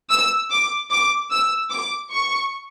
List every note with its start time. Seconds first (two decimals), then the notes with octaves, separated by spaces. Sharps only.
0.10 E6
0.51 D6
0.90 D6
1.31 E6
1.71 D6
2.11 C#6